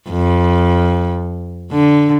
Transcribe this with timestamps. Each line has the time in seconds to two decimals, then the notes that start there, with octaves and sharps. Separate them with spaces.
0.10 F2
1.72 D3